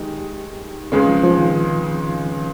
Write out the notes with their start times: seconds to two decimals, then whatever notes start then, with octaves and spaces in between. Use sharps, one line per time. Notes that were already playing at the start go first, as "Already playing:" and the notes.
Already playing: D#3 G#3 D#4 G4
0.92 C#2 C#3 G#3 C4
1.07 F3
1.23 F3
1.38 D#3